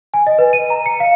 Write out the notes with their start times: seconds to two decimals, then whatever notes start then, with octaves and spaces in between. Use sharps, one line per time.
0.14 G#5
0.27 D#5
0.39 B4
0.53 D#7
0.70 A#5
0.86 C#7
1.00 F5